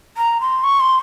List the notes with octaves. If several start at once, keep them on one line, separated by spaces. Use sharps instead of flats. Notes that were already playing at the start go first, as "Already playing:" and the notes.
A#5
C6
C#6
C6